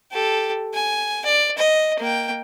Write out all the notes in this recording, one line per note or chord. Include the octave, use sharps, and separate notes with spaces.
G4 A4
G#5
D5
D#5
A#3 G5